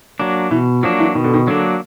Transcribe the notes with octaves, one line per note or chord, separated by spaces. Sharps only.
F#3 A#3 D4
B2 E3
F3 F#3 A#3 D4
E3
B2 D#3
D3
D#3
D3 F#3 A#3 D4